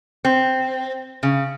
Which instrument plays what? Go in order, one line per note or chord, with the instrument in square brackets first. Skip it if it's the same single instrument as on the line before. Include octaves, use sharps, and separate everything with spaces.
[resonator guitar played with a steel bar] C4
C#3